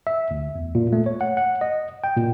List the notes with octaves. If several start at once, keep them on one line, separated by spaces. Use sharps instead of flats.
E5
D2
E2
A#2
A3
C#5
F#5
F#5
D#5
G5
A#2